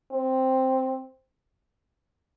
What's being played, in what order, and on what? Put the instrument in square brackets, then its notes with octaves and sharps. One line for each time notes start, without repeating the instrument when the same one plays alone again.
[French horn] C4